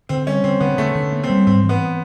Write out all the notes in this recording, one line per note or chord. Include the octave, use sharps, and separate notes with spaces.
D3 C4
G3 C#4
D3 C4
D3 B3
D3 A3
D3
A#3
C4
G3
G#2 C4
E3
B3